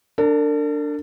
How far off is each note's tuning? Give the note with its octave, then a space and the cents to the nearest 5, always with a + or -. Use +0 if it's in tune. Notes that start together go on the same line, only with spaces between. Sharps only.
D4 +0 A#4 -45